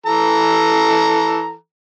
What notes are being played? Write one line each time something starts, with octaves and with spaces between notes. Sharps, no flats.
E3 A4 A#5